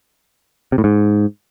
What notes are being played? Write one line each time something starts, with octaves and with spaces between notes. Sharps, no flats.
C3
A2
G#2